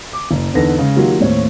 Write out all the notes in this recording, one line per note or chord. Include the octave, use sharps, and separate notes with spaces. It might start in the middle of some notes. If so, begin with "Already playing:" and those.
D6
F#1
E2 D3 D#4 A4 B4 A#6
C#3 G#3
D#3 F#3 A#3 F4 G4
D#2 A2 C4 C#5